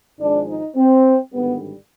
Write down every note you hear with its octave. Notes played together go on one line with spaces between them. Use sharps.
G#1 G#2 F3 G#3 D4
D#4
C4
G#1 G2 D3 G3 B3